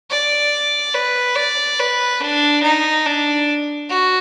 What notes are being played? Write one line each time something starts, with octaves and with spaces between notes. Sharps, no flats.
D5
B4
D5
B4
D4
D#4
D4
F#4